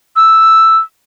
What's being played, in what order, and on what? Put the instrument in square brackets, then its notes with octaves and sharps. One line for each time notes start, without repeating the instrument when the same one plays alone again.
[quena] E6